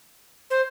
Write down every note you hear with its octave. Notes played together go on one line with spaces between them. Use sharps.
C5